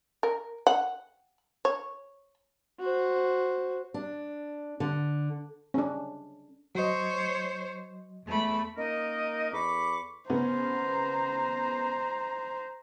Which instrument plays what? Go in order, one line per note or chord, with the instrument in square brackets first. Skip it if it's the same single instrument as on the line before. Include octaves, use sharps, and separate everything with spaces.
[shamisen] A#4
F#5
C#5
[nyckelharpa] F#4 C5
[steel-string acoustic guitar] D4
D3
[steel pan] C#4 D4
[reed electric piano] F#3 D#5 [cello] C5 C#5
[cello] E2 [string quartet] A3 B5
[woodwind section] A#3 C#4 D#4 A#4 D#5
E2 A4 B5 C#6 D6
[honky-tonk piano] C#3 B3 C#4 [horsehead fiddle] C5 A#5